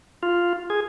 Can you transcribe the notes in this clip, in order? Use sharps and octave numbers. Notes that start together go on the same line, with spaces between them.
F4
G#4